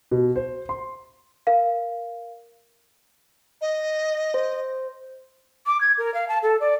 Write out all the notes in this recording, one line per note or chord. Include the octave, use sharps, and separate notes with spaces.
B2
C5
C6
A#4 F5
D#5
C5
D6
G#6
A#4
F5
A5
A4
D5